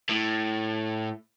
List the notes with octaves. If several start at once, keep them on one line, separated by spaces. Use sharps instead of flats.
A2